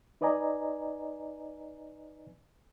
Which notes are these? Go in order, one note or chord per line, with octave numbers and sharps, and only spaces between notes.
D#4 B4 D5 D#5 G#5 A#5